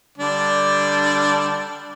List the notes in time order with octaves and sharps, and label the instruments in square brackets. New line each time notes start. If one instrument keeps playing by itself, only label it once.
[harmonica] D3 G3 D4